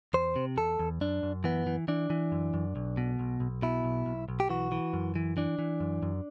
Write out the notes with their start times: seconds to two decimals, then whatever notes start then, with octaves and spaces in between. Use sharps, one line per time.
0.14 E2 C5
0.36 C3
0.57 E2 A4
0.79 E2
1.01 F#2 D4
1.23 F#2
1.44 E3 B3
1.67 E3
1.88 E3 D4
2.10 E3
2.32 F#2
2.54 F#2
2.76 B1
2.97 B2
3.19 B1
3.40 B1
3.62 B2 E4
3.84 B1
4.06 B1
4.29 B1
4.40 G4
4.49 E3 F#4
4.72 E3
4.93 F#2
5.16 E3
5.37 E3 D4
5.59 E3
5.80 F#2
6.03 F#2